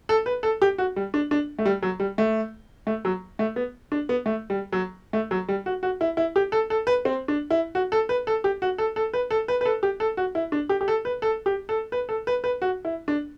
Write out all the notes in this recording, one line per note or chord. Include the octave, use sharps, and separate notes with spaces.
A4
B4
A4
G4
F#4
G3
D4
D4
A3
G3
F#3
G3
A3
A3
F#3
A3
B3
D4
B3
A3
G3
F#3
A3
F#3
G3
F#4
F#4
E4
E4
G4
A4
A4
B4
C4
D4
E4
F#4
A4
B4
A4
G4
F#4
A4
A4
B4
A4
B4
B4
A4
G4
A4
F#4
E4
D4
G4
G4
A4
B4
A4
G4
A4
B4
A4
B4
B4
F#4
E4
D4